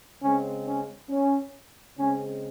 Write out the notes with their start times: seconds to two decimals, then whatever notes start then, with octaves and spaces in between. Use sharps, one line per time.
0.22 C#3 G#3 C4 C#4
0.66 C#4
1.10 C#4
1.97 C#3 G#3 C4 C#4